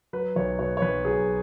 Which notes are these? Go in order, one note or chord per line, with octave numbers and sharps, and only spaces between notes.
F#3 B4
B1 C#5
B2 C#5
C#5
B1 B4
F#3 G#4